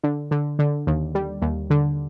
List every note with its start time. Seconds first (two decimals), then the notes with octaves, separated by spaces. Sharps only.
0.03 D3
0.31 D3
0.59 D3
0.87 D#2
1.15 G3
1.42 D#2
1.70 D3